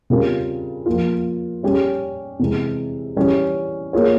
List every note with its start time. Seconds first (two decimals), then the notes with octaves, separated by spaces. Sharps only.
0.10 C#3 G3 C4 F4 A#4
0.86 F3 A#3 F4
1.63 G3 C#4 G4
2.39 C3 E3 G#3
3.16 E3 G3 C#4
3.93 A#3 F4 G#4 C#5